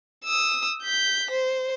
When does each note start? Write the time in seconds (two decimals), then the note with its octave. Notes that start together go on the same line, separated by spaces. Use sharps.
0.24 D#6 E6
0.83 G6 B6
1.31 C5